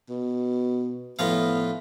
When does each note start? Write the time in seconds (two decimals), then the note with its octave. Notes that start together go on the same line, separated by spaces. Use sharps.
0.10 B2
1.19 A2 F3 B3 F5